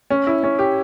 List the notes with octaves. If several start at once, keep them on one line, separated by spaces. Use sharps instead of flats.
C#4
E4
C#4
G4